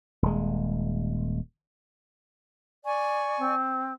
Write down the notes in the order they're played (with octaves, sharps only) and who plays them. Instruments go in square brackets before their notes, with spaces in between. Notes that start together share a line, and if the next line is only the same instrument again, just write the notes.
[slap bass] D#1 G#3
[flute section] D5 G#5 C#6
[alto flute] C4